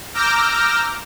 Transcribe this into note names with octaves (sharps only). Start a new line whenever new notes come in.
A#5 D6 E6 F6 G6 A#6